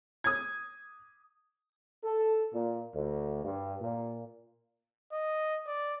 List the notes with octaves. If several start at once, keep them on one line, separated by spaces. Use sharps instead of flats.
D#6 G#6
A4
A#2
D2
G2
A#2
D#5
D5